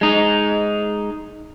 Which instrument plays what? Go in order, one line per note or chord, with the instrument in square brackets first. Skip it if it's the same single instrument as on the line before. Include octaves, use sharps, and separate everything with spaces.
[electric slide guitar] G#3 D#4